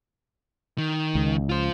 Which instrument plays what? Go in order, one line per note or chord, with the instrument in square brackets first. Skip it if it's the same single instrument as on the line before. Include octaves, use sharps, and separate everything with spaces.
[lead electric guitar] D#3
[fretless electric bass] C#2
[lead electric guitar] F4 C5